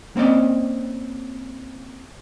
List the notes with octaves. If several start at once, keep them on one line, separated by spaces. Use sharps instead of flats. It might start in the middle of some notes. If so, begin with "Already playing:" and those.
A#3 C4 C#4 D5 D#5